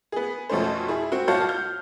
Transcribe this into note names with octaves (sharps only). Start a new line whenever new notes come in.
B3 G#4
F2 B2 A3 C#4 C5
E4 G#4
C4 F#4
B1 F#4 C#5 F5 A5 G6
F6 G6